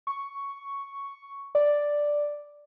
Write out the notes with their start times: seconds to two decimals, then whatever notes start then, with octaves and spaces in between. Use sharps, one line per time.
0.07 C#6
1.55 D5